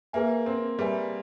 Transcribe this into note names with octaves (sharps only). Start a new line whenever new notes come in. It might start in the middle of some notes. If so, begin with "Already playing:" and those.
A#3 G#4 B4 E5 G#5
C4
G3 G#4 B4 E5 G#5